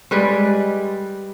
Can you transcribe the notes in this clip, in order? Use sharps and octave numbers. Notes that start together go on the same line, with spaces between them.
G3 G#3 B4 D5